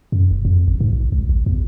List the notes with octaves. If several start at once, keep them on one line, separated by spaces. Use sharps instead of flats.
F#2
E1
F2
G#1
G#2
A#1
C#2
A1
E2